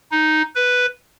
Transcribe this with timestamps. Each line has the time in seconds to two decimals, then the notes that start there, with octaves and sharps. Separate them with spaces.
0.12 D#4
0.56 B4